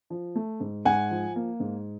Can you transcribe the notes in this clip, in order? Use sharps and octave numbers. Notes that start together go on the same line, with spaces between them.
F3
A3
G#2
G#2 F#5 G#5
F3
A#3
G#2